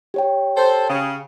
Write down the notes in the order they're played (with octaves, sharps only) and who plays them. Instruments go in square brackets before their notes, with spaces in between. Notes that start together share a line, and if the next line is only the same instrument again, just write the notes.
[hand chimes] G4 C#5 G5
[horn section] A4 C5
C#3